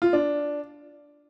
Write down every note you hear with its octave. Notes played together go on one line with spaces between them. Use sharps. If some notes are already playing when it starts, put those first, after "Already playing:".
F4
D4